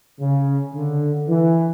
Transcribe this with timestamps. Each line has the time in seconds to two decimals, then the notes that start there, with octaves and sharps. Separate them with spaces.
0.21 C#3
0.75 D3
1.29 E3